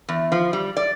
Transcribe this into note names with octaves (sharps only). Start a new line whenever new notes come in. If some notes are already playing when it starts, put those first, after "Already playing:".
E2
F3
G3
D5